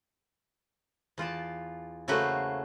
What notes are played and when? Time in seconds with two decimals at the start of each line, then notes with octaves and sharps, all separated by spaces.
1.18 E2 F4 D5 A5
2.08 C#3 A3 A#3 F#4 B4 C5